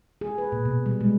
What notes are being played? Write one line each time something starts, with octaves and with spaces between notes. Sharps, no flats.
G#4
B4
A#2
B2
G3
G#3